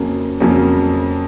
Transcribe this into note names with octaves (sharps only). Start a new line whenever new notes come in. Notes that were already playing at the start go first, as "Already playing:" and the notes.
Already playing: F2 C#3 F#3 A#3 C#4
F2 C#3 F#3 A#3 C#4